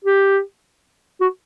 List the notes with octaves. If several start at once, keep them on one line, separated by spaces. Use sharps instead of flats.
G4
F#4